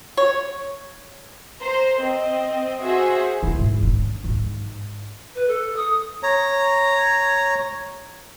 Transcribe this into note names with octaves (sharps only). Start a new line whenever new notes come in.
C#5
C5 A#5
C4 D#5
F#4 G#4 C5 E5
E4
G#2
A1 D4
G#2
B4
A4
D#6
C#5 A#5